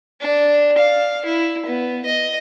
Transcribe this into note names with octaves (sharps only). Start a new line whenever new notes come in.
D4
F5
E4
B3
D#5